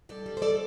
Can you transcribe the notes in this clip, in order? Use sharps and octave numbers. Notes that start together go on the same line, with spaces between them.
G2 A4 D5
G3
C5
A4 D5